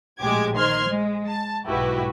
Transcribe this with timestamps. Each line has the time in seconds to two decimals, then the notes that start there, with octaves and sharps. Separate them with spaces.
0.19 A#1 A2 G#3 G4 D6 G#6
0.55 D#3 C5 C6 F6 G#6
0.88 G#3
1.28 A5
1.65 B1 G#2 E4 F#4 G4 B4